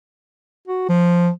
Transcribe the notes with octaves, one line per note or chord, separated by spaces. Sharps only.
F#4
F3